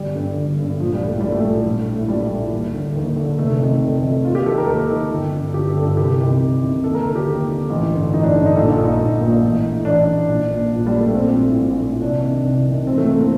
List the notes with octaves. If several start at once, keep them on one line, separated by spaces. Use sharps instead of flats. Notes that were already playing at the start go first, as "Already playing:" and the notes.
Already playing: G1 G3
G2 D3
G1
G2 D3
A#1 F3
G3
A2
A3
A#1 G3
A3
A2
A#1
A2
A#1 G3
A2
D#2
D3
D#2
D3
F1 A3
F2 D#3
F1
F2 D#3
D#2 F4
G4
D#3 A4
A#4
D#2 A4
D#3
G1
G2 D3
G1 G4
A4
G2 D3
A4
C2 G4
C3 D#3
C2
C3 D#3
D#2 A4
A#4
D3 A4
G4
D#2
D3
A1
G2 D3
A1 D#4
D4
G2 D3 D4
D#4
A#1 A4
F4
A#2
D#4
A#1
A#2
A1
A2
A1 D4
A2
A#1
A#2
A#1 F3
G3
A#2
A3
A#1 C4
A2
A#1
A2
C2 D4
C3 D#3
C2
C3 D#3
A1 C4
A3
A2 A#3
C4